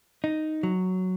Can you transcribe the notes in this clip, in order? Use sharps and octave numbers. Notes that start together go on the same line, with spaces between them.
D#4
F#3